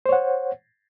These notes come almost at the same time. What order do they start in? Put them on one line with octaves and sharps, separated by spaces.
C5 C#5 F#5